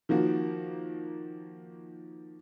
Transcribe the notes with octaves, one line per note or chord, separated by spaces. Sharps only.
D#3 F3 A#3 F#4